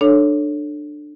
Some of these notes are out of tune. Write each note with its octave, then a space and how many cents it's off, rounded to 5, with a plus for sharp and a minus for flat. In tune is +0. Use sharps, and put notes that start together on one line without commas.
D4 +20 A4 +0 C#5 +0